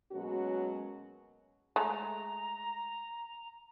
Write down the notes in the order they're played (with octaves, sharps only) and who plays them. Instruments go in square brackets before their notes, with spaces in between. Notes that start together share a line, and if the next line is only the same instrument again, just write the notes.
[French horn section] B2 F#3 G#3 A#3 C#4 F#4
[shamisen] G#3 A3 [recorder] A#5